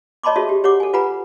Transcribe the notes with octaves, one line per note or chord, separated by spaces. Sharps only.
C#5 D#5 A5 B5 C6 D6
F#4 G#4 A4 C#5 D#5 E5
G4
G4 C#5 F#5 D6
A4 G#5
F4 B4 F#5 G#5 A#5 B5